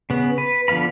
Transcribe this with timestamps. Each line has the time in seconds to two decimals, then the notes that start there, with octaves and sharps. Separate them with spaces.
0.10 C#3 B3
0.38 B4
0.68 D3 F3 B3 F5 B5